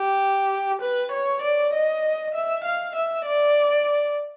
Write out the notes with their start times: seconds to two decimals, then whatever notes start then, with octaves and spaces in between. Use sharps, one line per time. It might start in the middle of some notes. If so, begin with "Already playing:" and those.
Already playing: G4
0.82 B4
1.12 C#5
1.42 D5
1.73 D#5
2.35 E5
2.64 F5
2.96 E5
3.26 D5